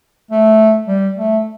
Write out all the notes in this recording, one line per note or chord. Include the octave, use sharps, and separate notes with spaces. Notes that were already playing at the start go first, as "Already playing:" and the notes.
A3
G3
A3